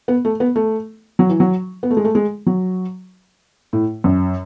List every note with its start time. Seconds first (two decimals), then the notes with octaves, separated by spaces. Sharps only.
0.08 B3
0.25 A3
0.40 B3
0.56 A3
1.19 F#3
1.29 E3
1.40 F#3
1.83 B3
1.90 A3
1.97 G#3
2.05 A3
2.15 G#3
2.46 F#3
3.73 A2
4.04 F#2